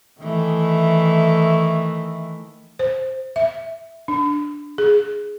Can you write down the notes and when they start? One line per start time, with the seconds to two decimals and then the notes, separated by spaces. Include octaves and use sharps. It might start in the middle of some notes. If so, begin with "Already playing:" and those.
0.21 D#3 E3 A3
2.79 C5
3.36 E5
4.08 D4
4.78 G#4